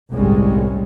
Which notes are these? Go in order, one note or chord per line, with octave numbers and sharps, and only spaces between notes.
G1 C2 A2 G3 G#3 C#4